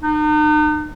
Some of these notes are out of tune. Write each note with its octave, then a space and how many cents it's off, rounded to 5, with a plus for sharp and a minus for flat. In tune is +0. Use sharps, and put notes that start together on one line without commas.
D#4 -40